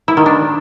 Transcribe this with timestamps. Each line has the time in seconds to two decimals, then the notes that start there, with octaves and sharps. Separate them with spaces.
0.08 E4
0.17 D#3
0.26 D4